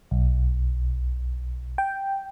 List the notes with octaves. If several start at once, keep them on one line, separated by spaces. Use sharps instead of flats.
B1
G5